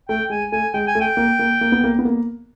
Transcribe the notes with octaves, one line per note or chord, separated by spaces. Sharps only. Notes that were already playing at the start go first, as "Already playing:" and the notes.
A3 G5
G#3 G#5
A3 G#5
G#3 G5
G#5
A3
G5
A#3
A#3
A#3
B3
A#3
B3
A#3